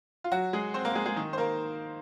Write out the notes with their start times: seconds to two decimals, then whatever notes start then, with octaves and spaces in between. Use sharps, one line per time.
0.24 F4
0.31 F#3 F#4
0.53 G#3 G#4
0.74 C4 C5
0.85 A#3 A#4
0.95 G#3 G#4
1.06 G#3 G#4
1.16 D#3 D#4
1.33 C5
1.38 A#3 A#4